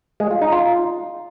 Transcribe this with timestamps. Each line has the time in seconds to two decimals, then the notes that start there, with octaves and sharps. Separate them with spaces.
0.20 G#3
0.31 F4
0.41 D#4
0.52 F4